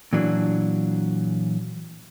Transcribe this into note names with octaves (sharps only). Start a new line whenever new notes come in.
A#2 E3 F#3 D4